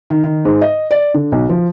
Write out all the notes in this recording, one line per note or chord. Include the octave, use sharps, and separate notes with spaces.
D#3
D#3
G#2
D#5
D5
D3
B1
F3